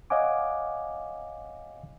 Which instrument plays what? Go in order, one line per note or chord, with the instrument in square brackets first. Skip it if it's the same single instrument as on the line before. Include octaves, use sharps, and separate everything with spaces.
[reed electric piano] C#5 D#5 F5 F#5 G#5 D6